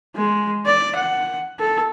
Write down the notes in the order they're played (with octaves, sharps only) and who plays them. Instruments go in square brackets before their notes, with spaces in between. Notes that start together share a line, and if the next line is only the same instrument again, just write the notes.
[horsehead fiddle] G#3
D5
F#5
A4